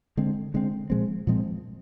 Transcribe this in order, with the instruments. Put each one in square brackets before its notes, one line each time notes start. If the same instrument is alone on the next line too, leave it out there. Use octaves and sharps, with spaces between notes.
[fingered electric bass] D3 G#3 C4
D3 G#3 C4
A#2 F3 G#3 C4
A#2 F3 G#3 C4